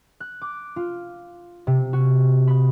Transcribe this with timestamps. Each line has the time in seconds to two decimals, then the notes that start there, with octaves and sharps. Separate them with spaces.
0.20 F#6
0.42 D6
0.76 F4
1.67 C3
1.93 F#4
2.48 B5